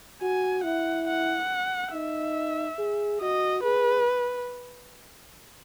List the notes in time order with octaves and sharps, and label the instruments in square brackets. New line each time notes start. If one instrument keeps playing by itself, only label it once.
[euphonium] F#4 [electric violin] G#5
[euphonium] E4 [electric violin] F#5
[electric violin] F#5
[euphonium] D#4 [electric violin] E5
[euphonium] G#4
[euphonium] F#4 [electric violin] D#5
[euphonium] G#4 [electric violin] B4